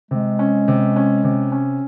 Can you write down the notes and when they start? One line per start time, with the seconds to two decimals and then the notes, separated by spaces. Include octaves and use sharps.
0.11 C3 G#3
0.39 C#4
0.68 C3
0.96 C#4
1.24 C3
1.52 C#4